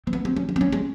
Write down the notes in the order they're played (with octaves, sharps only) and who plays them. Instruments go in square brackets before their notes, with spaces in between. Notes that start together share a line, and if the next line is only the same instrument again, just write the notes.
[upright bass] C4
B3
C4
C#4
D4
C4
C#4
G#3